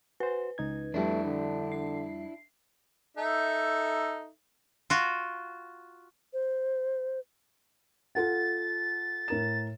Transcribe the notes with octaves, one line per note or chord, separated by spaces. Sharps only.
F#4 B4 C5
C#2 D#4 G#6
F2 G3 A3 D4 E4
D3
C7
D#4 A4 E5
F4 F#4
C5
F4 A4 F#5 A6
A2 A#4 E7